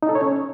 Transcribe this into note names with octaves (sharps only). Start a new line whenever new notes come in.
D#4
A4
C#5
C#4